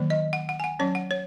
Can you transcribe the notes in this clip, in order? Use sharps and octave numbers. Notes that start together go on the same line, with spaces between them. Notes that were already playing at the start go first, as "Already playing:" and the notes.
Already playing: D#3 F#3 A#3
D#5
F#5
F#5
G#5
F#5
F#3 C#4 C#5
F#5
C#5